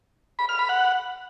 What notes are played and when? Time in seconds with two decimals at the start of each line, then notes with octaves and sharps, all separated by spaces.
0.39 B5
0.49 F6
0.59 B5
0.69 F#5